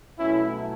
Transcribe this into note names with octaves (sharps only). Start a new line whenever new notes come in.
B2 F#3 A3 C#4 E4